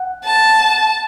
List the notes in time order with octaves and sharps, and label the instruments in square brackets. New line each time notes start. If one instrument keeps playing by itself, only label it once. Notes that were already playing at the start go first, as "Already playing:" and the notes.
Already playing: [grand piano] F#5
[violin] A5